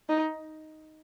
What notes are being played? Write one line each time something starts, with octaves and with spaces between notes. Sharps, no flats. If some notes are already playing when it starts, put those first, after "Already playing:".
D#4